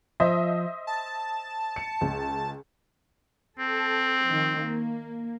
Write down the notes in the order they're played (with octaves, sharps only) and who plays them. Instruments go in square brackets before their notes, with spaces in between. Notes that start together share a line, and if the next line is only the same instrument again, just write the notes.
[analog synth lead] F3 [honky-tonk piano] C5 D#5 E5
[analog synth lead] A5
[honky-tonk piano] C#7
C#2
[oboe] C4 [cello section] A4
[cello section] D#3 F3
A#3